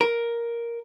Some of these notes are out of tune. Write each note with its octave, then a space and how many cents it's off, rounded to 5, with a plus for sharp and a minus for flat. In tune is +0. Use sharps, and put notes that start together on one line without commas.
A#4 +5